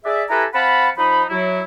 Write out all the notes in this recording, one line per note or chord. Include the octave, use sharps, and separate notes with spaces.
G#4 D5 E5
E4 G4 A4 B4 G#5 A#5
C4 F5 F#5 A5 B5
F3 D#4 B5
F#3 E4